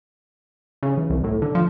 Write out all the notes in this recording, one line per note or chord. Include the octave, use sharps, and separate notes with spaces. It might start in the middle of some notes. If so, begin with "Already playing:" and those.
C#3
E3
C2
A2
D3
F3